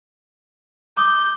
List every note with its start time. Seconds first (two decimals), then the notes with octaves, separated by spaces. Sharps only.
0.97 D6 D#6 G6